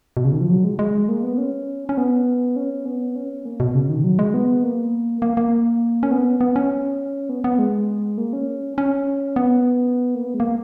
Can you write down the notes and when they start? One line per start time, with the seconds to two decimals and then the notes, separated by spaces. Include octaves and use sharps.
0.17 B2
0.24 C#3
0.33 D#3
0.41 F3
0.50 F#3
0.64 G#3
0.79 G#3
1.09 A#3
1.23 B3
1.38 C#4
1.89 C#4
1.98 B3
2.56 C#4
2.86 B3
3.16 C#4
3.45 A#3
3.60 B2
3.75 C#3
3.90 D#3
4.04 F#3
4.19 G#3
4.34 B3
4.63 A#3
5.22 A#3
5.37 A#3
6.03 C#4
6.11 B3
6.41 B3
6.56 C#4
7.29 B3
7.44 B3
7.59 G#3
8.18 A#3
8.33 C#4
8.78 C#4
9.36 B3
10.15 A#3
10.25 B3
10.34 G#3
10.40 A#3